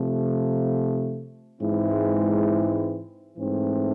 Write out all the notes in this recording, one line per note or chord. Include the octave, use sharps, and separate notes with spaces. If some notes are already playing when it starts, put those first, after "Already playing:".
Already playing: C3 F3 A3
G#2 E3 G#3 C4 E4
G#2 E3 A3 C4